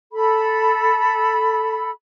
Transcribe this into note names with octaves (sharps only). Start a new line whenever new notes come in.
A4 B5